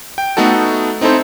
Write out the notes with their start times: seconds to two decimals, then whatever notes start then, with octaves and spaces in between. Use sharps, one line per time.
0.18 G5
0.37 A3 B3 D#4 F#4 A4
1.01 C4 D#4 E4 A4 C5